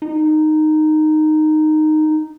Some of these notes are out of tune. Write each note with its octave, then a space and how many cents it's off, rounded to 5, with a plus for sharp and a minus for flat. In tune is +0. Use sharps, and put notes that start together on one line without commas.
D#4 -10